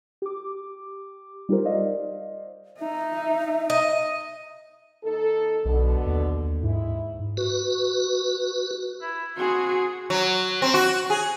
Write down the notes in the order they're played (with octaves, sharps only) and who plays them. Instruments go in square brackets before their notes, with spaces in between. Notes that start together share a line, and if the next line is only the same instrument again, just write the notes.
[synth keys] G4 D6
G3 D#4 F4 G4 A#4 C5
C5 D5 D#5 F5
[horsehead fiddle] D#4 [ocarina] E5
[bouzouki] D#5
[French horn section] D#2 D#4 A4
[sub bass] B1 [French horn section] B2 D3
[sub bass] D#2
[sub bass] G#2 [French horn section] G#3 E4
[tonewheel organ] F#4 B4
[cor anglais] E4
[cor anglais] C4 [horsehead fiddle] F#4 G#4
[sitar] F#3
C4
F#4
G#4